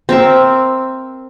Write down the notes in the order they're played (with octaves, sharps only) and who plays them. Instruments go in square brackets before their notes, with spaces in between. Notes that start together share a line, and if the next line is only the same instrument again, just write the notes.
[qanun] C4 A#4 E5